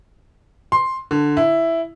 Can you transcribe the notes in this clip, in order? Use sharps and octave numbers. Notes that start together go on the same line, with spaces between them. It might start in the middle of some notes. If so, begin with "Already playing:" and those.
C6
D3
E4